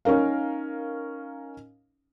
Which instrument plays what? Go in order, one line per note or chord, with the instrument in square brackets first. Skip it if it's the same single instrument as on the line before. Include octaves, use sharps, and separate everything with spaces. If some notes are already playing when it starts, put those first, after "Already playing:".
[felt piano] C#4 D#4 A#4 F5